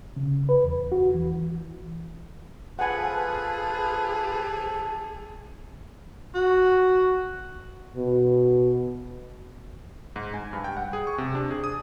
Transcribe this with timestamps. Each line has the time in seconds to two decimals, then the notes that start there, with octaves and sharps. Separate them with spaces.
0.16 C#3
0.49 B4
0.64 E2
0.92 F#4
1.14 E3
2.79 F3 G#4 A4 B4 F#5 G#5
6.34 F#4
7.96 B2
10.16 G#2
10.34 G#5
10.53 G2
10.64 G5
10.77 F#5
10.93 G#4
11.07 C#6
11.18 C3
11.35 D4
11.51 G#4
11.64 D#6